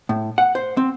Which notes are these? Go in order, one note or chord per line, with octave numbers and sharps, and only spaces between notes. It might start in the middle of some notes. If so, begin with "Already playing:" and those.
A2
F#5
C5
C4